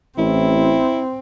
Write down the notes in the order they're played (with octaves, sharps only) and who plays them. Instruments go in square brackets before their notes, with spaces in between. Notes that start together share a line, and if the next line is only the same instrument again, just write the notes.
[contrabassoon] A1 [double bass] C4 [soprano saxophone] E4